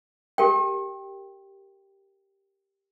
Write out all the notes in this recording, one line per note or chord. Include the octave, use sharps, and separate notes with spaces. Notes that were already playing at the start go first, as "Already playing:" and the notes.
G4 A#4 G5